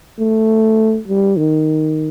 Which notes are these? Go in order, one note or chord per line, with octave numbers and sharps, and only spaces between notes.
A3
G3
D#3